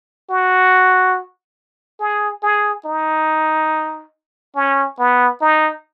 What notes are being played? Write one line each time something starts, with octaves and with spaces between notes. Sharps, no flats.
F#4
G#4
G#4
D#4
C#4
B3
D#4